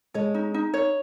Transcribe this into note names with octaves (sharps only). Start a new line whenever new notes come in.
G#3 C#5
D#4
D#4
C#5